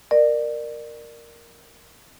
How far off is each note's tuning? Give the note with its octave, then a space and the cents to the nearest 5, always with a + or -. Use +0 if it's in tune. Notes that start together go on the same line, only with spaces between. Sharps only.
A#4 +0 D5 +25